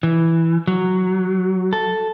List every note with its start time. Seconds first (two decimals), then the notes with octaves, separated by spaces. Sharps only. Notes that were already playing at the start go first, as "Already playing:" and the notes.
0.03 E3
0.67 F#3
1.73 A4